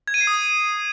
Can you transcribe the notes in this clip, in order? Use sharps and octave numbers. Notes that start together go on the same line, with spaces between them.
G#6
D#7
C7
D#6